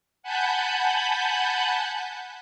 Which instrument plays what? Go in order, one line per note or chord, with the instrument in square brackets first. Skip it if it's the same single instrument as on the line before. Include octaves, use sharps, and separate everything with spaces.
[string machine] F#5 G#5 A5 B5 F#6 G6